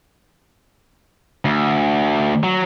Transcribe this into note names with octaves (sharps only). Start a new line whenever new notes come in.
D2
F#3